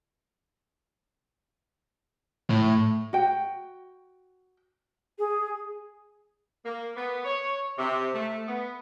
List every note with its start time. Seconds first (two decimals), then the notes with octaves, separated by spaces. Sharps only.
2.50 A2
3.13 F#4 G5
5.19 G#4
6.64 A#3
6.96 B3
7.24 C#5
7.78 C3
8.13 A3
8.48 B3